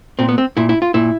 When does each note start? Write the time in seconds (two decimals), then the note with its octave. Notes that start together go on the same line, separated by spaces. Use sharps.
0.19 A#2 C4
0.29 B3
0.38 C4
0.57 A#2 E4
0.69 E4
0.82 F4
0.94 A#2 E4